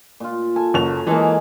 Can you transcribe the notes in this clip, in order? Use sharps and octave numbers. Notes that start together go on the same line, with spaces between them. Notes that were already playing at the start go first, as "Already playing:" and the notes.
A#2 F4
A4 G#5
F#1 F#3 F7
E3 G#3 A#3 G#4 A4